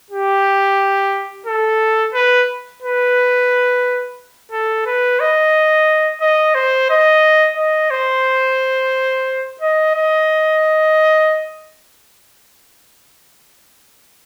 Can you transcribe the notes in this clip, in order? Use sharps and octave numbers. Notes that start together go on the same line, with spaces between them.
G4
A4
B4
B4
A4
B4
D#5
D#5
C5
D#5
D#5
C5
D#5
D#5